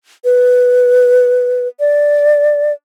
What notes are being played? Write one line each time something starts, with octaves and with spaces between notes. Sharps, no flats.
B4
D5